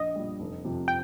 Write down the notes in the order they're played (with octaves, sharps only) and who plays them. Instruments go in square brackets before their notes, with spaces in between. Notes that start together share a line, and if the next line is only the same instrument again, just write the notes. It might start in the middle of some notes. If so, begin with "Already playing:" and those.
Already playing: [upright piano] A#1 [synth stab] D#5
[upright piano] A#2 G3
F1
F2 C3 F3
[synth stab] G5